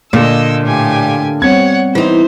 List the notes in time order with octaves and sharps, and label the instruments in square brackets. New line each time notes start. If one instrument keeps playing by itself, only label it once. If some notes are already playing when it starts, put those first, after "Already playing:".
[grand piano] A#2 [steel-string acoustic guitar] D3 A#3 [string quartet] D#5 E6
[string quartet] A2 G4 G#5
[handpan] G3 B3 C4 [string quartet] C#5 F#5 [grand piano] G#6
[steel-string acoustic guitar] E3 D#4 [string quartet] C5